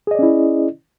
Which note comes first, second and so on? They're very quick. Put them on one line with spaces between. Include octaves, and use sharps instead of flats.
G#4 D#5 D5 C#4 E4